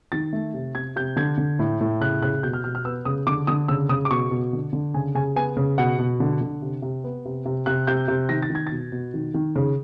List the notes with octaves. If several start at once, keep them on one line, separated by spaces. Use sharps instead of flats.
D#3 A6
A3
C3
C3 G#6
C3 G6
D3 G#6
D3
A2
A2
C#3 F#6
C#3 F#6
B2 G6
F6
B2 F6
F6
B3 E6
C#3 D#6
D3 D6
D3 D#6
C#3 E6
C#3 D#6
D6
B2 C#6
B2
D3
D3
C#3 G#5
C#3 G#5
B3 G#5
C#3
B2 F#5
B2
D3
D3
C3
C3
B3
C3
C3
C3 F#6
C3 G6
C3
D#3 A#6
A6
D#3
G#6
B2 A6
B2
D#3
D#3
C#3